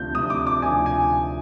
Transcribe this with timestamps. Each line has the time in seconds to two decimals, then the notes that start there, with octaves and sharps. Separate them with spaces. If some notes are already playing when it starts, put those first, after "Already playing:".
Already playing: D2 C3 F3 G6
0.14 D2 C3 F3 D#6
0.30 D6
0.47 D6
0.62 D2 C3 F3 G#5
0.86 G#5